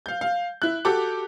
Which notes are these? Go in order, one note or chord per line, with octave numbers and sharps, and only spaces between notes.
F5 G6
F5
E4 F#6
F#4 G4 A4 D6